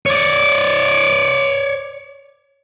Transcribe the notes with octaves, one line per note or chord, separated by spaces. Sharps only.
C#5 D5